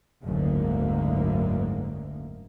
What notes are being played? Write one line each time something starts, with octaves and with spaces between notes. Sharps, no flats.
F#1 D2 G#2 D3 A#3